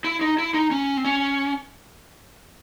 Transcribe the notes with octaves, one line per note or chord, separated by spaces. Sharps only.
E4
D#4
E4
D#4
C#4
C4
C#4